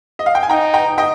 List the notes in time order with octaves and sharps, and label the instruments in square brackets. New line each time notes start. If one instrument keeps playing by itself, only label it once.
[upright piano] D#5
F5
G5
G#5
[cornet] D#4 [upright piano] G5 A#5
[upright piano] G5 A#5
D#5 G5